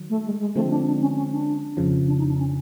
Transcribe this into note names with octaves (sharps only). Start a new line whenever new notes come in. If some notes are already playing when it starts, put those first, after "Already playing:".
Already playing: D#3 F#3
A3
G#3
G#3
D3 F3 G#3 A3 C4
D4
D4
C#4
C#4
D4
F2 C#3 F3
D4
D#4
D4
C#4